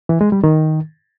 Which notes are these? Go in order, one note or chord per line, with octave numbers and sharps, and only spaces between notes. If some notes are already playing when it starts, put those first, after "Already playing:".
E3
G#3
G3
D#3